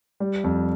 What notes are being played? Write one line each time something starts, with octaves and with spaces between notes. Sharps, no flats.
G3
F2